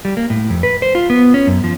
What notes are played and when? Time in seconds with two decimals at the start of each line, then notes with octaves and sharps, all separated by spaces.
0.05 G3
0.17 A#3
0.30 A2
0.50 F2
0.63 B4
0.82 C5
0.95 F4
1.10 B3
1.34 C#4
1.47 F#2
1.64 F3